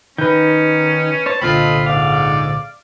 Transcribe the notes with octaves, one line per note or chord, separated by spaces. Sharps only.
D#3 C#4 D#4 B4 G6
C5 C#5 A5
C2 A#2 D3 C4 F4 A4 D#5 B5
G#2 D5 F5